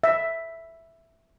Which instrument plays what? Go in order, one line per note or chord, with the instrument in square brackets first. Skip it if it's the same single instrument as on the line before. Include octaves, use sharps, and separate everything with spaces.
[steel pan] E5